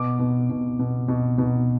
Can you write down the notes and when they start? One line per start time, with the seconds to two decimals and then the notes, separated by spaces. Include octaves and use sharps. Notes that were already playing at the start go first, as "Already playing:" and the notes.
Already playing: B2 D6
0.19 B2
0.50 B2
0.79 B2
1.08 B2
1.38 B2